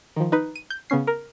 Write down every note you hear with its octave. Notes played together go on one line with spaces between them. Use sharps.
D#3 F3
D#4 B4
D#7
G6
C#3 B3 C#4 C7
A#4